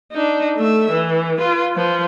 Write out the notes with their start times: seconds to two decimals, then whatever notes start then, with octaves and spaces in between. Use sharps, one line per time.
0.12 D4 D#4
0.57 A3 E5
0.91 E3
1.38 F4 B4
1.76 F3 B4